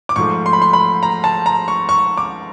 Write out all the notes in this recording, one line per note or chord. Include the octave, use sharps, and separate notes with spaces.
D6
G#2 F3 A3 C#6
C6
B5
C6
B5
A#5
A5
A#5
C#6
C#6
D6